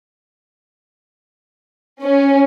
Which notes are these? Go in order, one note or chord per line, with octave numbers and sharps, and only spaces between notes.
C#4